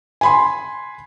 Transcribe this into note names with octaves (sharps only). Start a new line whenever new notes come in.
G#5 B5 C6